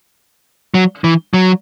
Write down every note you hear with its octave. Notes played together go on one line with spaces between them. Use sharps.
F#3
E3
F#3